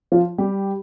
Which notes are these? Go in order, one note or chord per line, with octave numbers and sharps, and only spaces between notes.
F3 F4
G3 G4